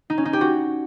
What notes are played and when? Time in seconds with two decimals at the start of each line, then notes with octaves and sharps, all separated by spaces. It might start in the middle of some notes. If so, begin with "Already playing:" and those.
0.10 D#4
0.18 C#4
0.25 D#4
0.33 G4
0.41 F#4